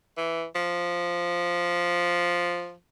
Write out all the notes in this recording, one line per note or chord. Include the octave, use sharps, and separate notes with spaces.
E3
F3